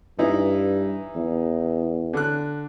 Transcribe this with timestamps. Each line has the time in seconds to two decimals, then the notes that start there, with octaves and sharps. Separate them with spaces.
0.19 G2 E3 D#4 E4
1.16 E2
2.13 D3 F#6